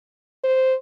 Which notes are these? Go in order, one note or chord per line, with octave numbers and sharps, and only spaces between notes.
C5